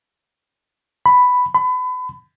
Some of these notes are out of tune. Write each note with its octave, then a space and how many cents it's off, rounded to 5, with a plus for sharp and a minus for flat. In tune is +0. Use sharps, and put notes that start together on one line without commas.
B5 +5
B5 +30